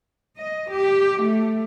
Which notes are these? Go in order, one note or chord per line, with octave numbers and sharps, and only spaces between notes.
D#5
G4
A3